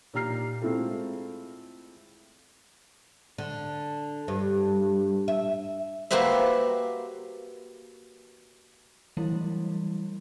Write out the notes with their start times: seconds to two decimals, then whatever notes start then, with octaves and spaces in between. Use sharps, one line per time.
0.14 A#2 D#4 G4 A#5 F6 C7
0.62 G#3 A3 C4 E4 F4 A4
3.38 D3
4.28 G2
5.28 E5
6.11 A#3 F#4 G4 B4 C5 E5
9.17 E3 F#3 G3 A3 E4